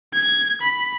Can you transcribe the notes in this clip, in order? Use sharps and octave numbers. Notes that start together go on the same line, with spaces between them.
G#6
B5